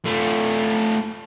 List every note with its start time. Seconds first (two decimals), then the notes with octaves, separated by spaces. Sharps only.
0.06 A3 F4